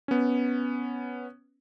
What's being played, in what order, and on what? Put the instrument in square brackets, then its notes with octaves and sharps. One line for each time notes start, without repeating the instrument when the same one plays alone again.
[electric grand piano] B3 C#4